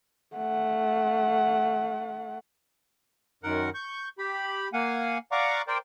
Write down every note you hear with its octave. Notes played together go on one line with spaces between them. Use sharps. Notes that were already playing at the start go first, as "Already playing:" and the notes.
A3 F#5
F#2 D#3 A#4 F#5
C#6 G6
G4 B5
A#3 F5 F#5 G#5
D5 F5 F#5 A#5 C#6 D6
A#4 C5 D5 G5